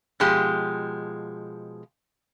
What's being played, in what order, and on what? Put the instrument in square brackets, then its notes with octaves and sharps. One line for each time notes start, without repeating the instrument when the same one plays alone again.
[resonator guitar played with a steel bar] B2 F3 G#3 G4